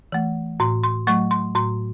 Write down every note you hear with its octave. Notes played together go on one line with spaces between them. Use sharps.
E3 A3
A2 C6
C6
F#3 A3 C#6
C6
A2 C6